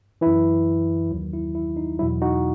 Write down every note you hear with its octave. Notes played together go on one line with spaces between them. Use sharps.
F#2 E3 E4
D#2 D#3 F#3
E4
E4
D#4
E2 B2 F#3 E4
D#4 F#4